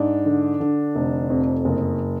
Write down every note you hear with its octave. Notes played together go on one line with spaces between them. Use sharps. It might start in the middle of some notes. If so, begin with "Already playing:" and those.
Already playing: G#2 D4
D3
D3
F1
F2
F#1